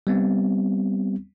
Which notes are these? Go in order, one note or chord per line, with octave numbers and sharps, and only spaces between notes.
G3 B3 C4